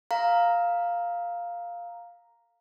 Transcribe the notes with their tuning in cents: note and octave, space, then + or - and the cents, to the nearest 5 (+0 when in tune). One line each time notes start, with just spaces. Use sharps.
A4 +45 F5 +0 A#5 +0